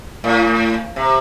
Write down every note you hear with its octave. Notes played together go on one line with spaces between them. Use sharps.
A2
C3